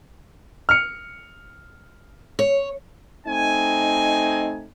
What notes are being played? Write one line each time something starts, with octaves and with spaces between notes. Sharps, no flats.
F6 C#7
C#5
A3 C4 D#4 G#5